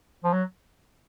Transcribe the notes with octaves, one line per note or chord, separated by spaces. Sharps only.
F3
F#3